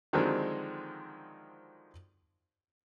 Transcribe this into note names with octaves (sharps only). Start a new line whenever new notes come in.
D3 D#3 F3 F#3 G#3 C4